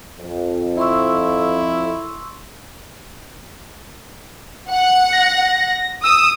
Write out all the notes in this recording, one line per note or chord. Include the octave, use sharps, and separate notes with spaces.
F2
E4 C6 C#6 E6
F#5
A#6
D#6 E6